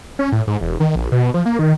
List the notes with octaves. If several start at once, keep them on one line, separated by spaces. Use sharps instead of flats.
C#4
A2
G#2
E1
D#3
A#1
B2
F3
A#3
D#3